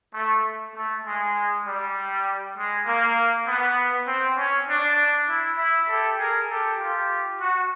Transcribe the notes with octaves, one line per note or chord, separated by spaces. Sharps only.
A3
A3
G#3
G3
G#3
A#3
B3
C4
C#4
D4
E4
E4
G4 A4
G#4 A#4
G4 A4
F4 G4
F#4